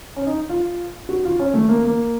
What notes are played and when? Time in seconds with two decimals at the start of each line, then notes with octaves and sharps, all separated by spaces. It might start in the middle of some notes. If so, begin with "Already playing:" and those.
0.16 C#4
0.27 D#4
0.49 F4
1.09 F#4
1.25 F4
1.40 C#4
1.54 A3
1.69 A#3
1.85 A#3